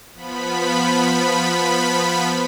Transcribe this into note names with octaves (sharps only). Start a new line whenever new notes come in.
F3 B3 B5